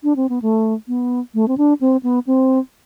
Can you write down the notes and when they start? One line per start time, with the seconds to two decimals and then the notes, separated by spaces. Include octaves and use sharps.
0.04 D4
0.16 C4
0.29 B3
0.42 A3
0.88 B3
1.34 A3
1.48 C4
1.58 D4
1.81 C4
2.03 B3
2.27 C4